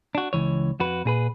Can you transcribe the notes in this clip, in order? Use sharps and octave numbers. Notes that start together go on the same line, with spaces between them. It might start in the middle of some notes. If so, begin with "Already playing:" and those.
D4 F#4
C#2 G2 E3 C#5
F2 F#4 B4
A#2 G#4 B4